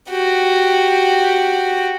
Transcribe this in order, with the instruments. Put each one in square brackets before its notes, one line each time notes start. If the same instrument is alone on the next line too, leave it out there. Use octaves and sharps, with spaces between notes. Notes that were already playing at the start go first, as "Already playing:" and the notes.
[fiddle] F#4 G4